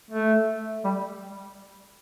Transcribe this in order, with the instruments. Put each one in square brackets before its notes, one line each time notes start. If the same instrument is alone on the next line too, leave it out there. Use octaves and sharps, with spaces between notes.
[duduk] A3
G3